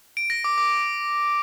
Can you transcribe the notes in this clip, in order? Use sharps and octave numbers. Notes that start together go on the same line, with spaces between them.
D7
A#6
D6
D6